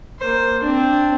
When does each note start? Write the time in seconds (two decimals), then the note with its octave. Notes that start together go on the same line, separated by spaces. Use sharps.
0.19 A#3 C5
0.62 C4 D4